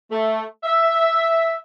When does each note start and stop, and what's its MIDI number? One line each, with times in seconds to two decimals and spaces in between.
0.11 0.43 57
0.64 1.54 76